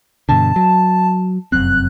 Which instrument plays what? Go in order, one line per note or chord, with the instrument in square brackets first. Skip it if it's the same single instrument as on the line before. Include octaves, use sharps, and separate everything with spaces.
[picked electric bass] G2 B2 D3 [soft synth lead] A5
[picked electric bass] F#3
[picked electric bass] F1 F#2 C4 [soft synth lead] F#6